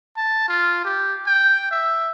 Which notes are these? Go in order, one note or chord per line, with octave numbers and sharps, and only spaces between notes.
A5
F4
G4
G5
E5